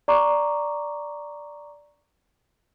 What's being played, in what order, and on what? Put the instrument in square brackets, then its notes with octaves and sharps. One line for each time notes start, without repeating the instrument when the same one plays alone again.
[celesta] D5 A#5 C#6 D6